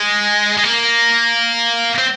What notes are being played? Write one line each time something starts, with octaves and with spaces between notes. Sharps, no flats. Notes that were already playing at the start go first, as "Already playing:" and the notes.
Already playing: G#3
G#3
A#3
C4